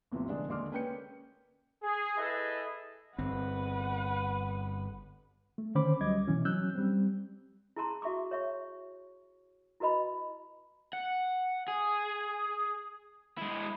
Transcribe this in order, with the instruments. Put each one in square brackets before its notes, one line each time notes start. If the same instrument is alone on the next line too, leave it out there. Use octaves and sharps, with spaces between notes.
[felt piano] A1 E2 C3 F3
F1 D3 G#3 D4
D#2 D3 G#3 C6 D6 F6
A#3 C#4 B4 G5 G6 C#7
[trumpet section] G#4
E4 G#4 A4 B4 D#5 E5
[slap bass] G1 C4 [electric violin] B4 F#5
[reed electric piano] A3
D3 D#3 C#4 C5 B5 D6
D2 F#3 G3 D#5 D6 G#6
B2 E3 C#4
F#3 C#4 E6 F#6 G6
G3 C4
[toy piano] E4 G#4 A5 A#5 C6
F#4 E5 C#6 D6
C#5 E5 C#6
E4 F#4 B4 D#5 B5
[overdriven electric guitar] F#5
G#4
G#3 E4